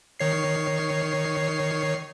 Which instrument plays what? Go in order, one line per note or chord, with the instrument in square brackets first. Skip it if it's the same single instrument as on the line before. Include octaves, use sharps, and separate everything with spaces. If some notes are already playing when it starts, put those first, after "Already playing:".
[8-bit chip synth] D#3 C#5 C7